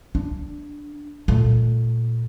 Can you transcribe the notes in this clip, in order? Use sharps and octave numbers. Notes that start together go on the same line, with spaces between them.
D4
A#2 A3